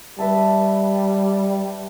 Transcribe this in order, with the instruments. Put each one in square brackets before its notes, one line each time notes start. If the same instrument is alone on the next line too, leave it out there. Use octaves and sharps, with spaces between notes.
[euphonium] G3 [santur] B4 E5 A5